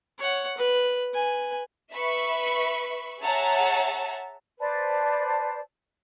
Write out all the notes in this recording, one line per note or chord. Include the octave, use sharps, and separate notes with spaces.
C#5 F#5
B4
B4 G#5
B4 E5 B5 C#6
G#4 C#5 E5 F#5 A5 A#5
B4 C5 D5 A5